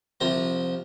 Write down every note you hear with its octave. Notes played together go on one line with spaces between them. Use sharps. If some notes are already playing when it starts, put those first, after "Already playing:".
C2 F3 A#5